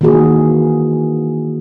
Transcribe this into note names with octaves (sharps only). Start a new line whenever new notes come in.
D#3 E3 A#3 F#4 G#4